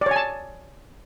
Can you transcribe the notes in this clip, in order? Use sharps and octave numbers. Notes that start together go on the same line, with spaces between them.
C#5 D5 G#5 A5